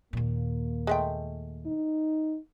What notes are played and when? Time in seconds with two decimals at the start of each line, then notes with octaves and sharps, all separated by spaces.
0.13 D#2 A#2 A#3
0.87 G#3 A3 G5
1.66 D#4